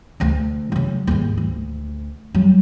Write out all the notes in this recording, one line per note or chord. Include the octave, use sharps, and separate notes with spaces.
D2 D3
C#3 F#3
D#2 G#2
D2
F#3 G3